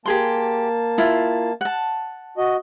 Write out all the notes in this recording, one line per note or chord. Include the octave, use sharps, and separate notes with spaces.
A#3 G4 G#4 A5 C6
E4 F4
F#5 A5
F#4 D#5